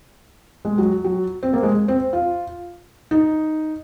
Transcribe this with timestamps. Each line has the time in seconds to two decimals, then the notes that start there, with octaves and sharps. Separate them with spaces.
0.65 G#3
0.78 F#3
1.05 F#3
1.43 C4
1.53 A#3
1.63 G#3
1.88 C4
2.13 F4
3.11 D#4